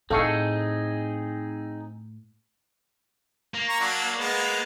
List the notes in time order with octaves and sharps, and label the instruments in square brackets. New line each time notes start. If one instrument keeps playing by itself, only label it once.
[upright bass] A2 [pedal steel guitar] C4 D#4 G#4 [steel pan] A4 F5 C#6
[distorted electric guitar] A#3
[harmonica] A#5 C#6
F#3 D4
G#3 B3